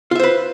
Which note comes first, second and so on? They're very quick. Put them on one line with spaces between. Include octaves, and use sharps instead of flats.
F4 E5 C5 B4